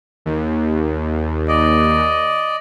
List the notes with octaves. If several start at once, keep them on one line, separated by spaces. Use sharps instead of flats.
D#2
D5 D#5